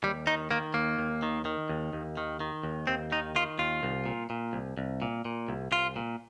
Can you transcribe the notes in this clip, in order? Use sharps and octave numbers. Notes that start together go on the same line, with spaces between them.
D#2 G3
D#3 D#4
D#3 A#3
D#2 A#3
D#2
D#3
D#3
D#2
D#2
D#3
D#3
D#2
D#2 C4
D#3 D#4
D#3 F4
D#2 F4
C2
A#2
A#2
C2
C2
A#2
A#2
C2
C2 F4
A#2